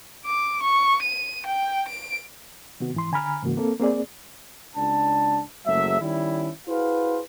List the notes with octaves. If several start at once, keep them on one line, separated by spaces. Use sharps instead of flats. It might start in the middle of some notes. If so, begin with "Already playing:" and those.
D6
C#6
D#7
G5
D7
C3 D#3 B3 F#4
G#2 E3 C6
D3 G#5 A#5 B5 F6
G#2 C#3 E3 A#3 F#4
A#3 C4 A4
A#3 C4 G#4 D5
C#2 D4 A5
F#1 F#3 G#3 A3 E5
D#3 G3 C#4 E4
E4 F#4 G#4 B4 C5 F5